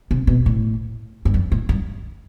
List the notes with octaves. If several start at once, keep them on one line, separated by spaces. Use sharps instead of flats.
C3
B2
A2
G2
F2
A2
G2